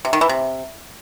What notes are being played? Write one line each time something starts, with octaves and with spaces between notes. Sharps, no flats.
C3
D#3
E3
C3